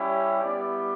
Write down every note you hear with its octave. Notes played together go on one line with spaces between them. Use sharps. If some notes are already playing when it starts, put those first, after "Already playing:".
Already playing: G3 C#4 E4 G4
G3 B3 E4 G4 D5